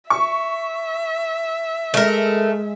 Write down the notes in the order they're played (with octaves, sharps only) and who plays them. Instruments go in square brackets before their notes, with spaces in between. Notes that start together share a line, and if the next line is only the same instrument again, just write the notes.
[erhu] E5 [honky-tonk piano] C#6
[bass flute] G#3 [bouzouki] A3 A#4